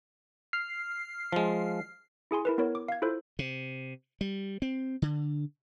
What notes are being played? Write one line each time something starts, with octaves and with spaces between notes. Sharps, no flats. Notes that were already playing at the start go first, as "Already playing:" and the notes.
F6 C7
F3 G#3
E4 G#4 G#5 C6
E4 A#4 B4
B3 E4 A#4 C#5
D6
F5 G#6
E4 F4 A4 C5
C3
G3
C4
D3